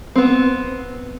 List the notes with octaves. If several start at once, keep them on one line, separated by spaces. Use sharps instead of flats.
B3 C4